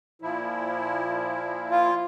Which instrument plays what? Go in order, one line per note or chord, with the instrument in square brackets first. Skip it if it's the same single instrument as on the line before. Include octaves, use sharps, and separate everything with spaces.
[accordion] A#2 F3 E4
[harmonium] F4